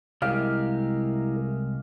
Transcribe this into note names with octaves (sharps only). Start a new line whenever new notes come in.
C2 G#3 E4 G4 A#4 F5